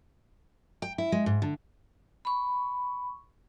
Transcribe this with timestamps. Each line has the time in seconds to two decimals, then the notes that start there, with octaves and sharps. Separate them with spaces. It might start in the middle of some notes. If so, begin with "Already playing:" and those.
0.82 G5
0.98 E4
1.12 G#3
1.26 G#2
1.42 D3
2.25 B5 C#6